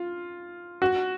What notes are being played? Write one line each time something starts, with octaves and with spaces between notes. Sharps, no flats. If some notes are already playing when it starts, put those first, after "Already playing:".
Already playing: F4
F#4